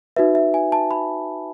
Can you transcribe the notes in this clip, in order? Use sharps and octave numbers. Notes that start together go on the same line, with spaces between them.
D#4 F#4 B4 E5
E5
G#5
A5
B5